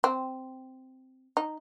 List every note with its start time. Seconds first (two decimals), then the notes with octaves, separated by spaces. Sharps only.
0.04 C4
1.37 D#4